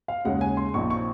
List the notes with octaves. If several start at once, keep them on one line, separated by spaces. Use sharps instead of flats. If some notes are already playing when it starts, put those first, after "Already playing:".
F5
D#2 C#3 G#3 F#5
G#5
C6
A#1 A#2 F3 C4 D#4 C#6
C#6